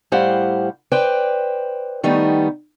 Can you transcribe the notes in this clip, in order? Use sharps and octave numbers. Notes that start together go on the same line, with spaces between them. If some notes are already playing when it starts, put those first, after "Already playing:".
A2 G3 G4 C5 F5 F#5
B4 C5 D5 G5
D#3 G3 A3 B3 D#4